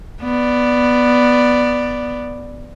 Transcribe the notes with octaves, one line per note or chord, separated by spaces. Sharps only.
B3 D5